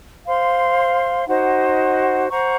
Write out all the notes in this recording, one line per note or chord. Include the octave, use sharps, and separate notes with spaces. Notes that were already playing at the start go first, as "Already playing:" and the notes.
C5 F5 C6
D#4 F#4 C5 F#5
C5 F#5 A#5 C#6